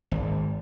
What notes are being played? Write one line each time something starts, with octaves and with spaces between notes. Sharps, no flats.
G#1